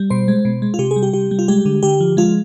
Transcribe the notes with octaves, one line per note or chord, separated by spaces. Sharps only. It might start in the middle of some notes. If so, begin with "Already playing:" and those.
Already playing: G3
B2 C5
G#3
B2
G#3
F4
C3 G4
G#4
G3
G4
C3 G4
G3
F4
G#3 G4
D3
D3 G4
F3
G#3 F4